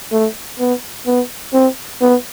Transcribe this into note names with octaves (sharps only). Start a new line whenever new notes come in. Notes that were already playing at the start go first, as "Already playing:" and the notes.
A3
B3
B3
C4
B3